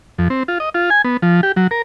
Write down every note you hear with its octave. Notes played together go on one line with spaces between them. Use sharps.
F2
C4
F4
D#5
F4
G#5
B3
F3
G4
F#3
A#4